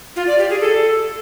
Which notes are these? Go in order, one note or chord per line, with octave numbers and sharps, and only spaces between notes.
F4
D5
G4
G#4
A4